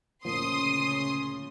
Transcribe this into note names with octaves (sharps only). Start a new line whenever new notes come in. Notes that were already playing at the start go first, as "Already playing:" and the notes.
D2 A#2 C#3 F3 C6 D#6